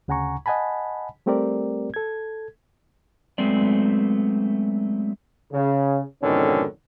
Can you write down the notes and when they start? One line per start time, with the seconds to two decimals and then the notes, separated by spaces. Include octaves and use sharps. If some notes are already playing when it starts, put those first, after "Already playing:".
0.08 D2 C#3 F#5 G#5 A#5 C#6
0.46 D#5 F#5 G#5 A5 B5
1.26 G3 A3 C4 G4 A#4 D5
1.94 A4 G#6
3.38 F#3 G#3 A3 B3 C4 D5
5.52 C#3
6.23 F2 G#2 B2 D3 D#3 C#4